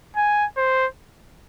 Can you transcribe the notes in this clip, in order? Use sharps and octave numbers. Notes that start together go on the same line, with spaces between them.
G#5
C5